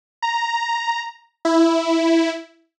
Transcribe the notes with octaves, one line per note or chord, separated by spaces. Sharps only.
A#5
E4